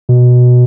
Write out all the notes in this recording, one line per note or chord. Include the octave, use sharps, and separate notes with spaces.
B2